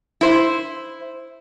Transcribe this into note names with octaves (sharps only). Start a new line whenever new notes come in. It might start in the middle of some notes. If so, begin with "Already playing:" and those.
E4 C5